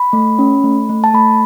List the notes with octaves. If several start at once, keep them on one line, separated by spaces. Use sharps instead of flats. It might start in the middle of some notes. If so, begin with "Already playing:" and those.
Already playing: B5
A3
C#4
A3
A3
A5
A3 B5